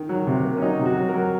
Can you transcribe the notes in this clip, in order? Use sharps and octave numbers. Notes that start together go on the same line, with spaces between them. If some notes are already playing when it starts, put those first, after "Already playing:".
Already playing: D#3
F#3
C3
A#3
C#4
F#3 D#4
C3
F#4
F#3
A#4
F#3